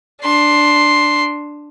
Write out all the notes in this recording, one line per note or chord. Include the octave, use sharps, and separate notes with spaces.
D4 C6